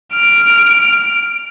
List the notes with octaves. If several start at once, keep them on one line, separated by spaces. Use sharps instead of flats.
F6 D7